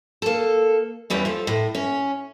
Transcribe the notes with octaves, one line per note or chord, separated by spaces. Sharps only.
A#3 A4
E2 E3 G3 C#4
F3 A4
A2
C#4